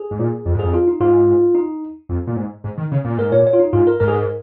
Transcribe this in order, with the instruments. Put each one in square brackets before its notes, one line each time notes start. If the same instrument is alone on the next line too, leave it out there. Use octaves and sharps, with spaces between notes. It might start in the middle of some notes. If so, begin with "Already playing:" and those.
Already playing: [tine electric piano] G#4
[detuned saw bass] G#2
A#2
F2
G#2
[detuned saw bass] F2 [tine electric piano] G#4
[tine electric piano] F4
D#4
[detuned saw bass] G#2 [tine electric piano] F4
[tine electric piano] D#4
[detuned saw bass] F2
A#2
G#2
G#2
D#3
C#3
A#2
[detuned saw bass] G#2 [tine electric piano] A#4
[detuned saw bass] A#2 [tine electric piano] C#5
[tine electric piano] C#5
F4
D#4
[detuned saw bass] G#2 [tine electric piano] F4
[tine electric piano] A#4
[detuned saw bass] G#2 [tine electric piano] A#4
[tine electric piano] G#4
A#4